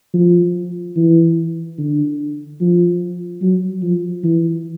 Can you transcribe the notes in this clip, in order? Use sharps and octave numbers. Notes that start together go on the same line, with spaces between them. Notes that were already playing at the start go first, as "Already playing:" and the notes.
F3
E3
D3
F3
F#3
F3
E3